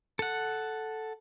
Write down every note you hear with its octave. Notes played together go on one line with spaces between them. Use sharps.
A4 F#5